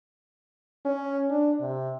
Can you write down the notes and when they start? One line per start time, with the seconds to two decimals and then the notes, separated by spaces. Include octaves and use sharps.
0.85 C#4
1.30 D4
1.60 C3